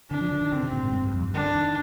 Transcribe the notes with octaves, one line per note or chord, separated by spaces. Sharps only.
D3 D4
F3
D3
D#3
D3 C4
C3
A#2
G#2
G2
G2
F2
G2
D3 D4
D#3